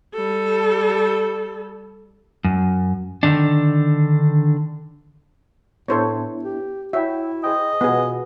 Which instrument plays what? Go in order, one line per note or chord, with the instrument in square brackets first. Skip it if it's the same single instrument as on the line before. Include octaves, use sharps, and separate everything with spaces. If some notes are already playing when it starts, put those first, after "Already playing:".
[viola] G3 A4
[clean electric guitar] F#2
D3 D#3 D4
[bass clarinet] A2 [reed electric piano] B3 D4 E4 [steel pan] A4 C5 C#5
[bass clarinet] G4
[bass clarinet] E4 [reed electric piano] F#4 C#5 G5 [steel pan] E5
[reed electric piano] G#4 C5 G5 [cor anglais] D#5
[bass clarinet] B2 [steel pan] B3 G#4 [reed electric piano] F4